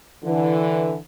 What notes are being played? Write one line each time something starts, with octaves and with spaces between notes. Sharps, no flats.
D3 E3